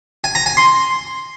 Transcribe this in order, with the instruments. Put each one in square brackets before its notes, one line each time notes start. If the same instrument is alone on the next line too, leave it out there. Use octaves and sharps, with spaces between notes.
[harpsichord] G#5
A#5
G#5
C6